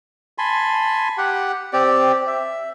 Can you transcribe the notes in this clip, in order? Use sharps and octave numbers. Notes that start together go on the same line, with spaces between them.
G#5 A5 B5 C6
G4 F#5
C4 G4 D5
E5